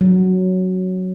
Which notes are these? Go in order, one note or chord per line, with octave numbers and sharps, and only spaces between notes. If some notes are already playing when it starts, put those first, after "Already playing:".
F#3